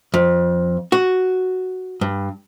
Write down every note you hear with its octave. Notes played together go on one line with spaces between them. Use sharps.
F2
F#4
G2